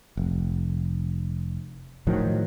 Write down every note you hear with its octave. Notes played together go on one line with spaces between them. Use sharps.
F1
A2 D#3 F3 F#3